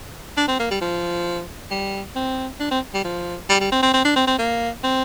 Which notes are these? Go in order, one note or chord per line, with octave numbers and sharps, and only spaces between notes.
D4
C4
A#3
G3
F3
G3
C4
D4
C4
G3
F3
G3
G3
C4
C4
C4
D4
C4
C4
A#3
C4